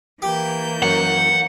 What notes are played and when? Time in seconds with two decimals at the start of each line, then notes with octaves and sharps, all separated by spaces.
0.22 E3 A#3 G4 G6
0.82 F#2 F#5